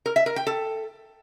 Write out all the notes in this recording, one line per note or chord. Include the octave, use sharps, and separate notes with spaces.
A#4
E5
A#4
G5
A4